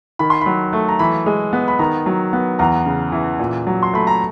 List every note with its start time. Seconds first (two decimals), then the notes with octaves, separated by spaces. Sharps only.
0.19 D#3 B5
0.30 C6
0.41 F#3 B5
0.73 A3
0.89 A#5
0.99 E3 B5
1.26 G#3
1.53 B3
1.68 B5
1.79 D#3 A#5
2.06 F#3
2.33 B3
2.59 E2 A#5
2.86 C#3
3.12 E3
3.39 A#2
3.67 F#3
3.83 C6
3.93 A3 B5
4.07 A#5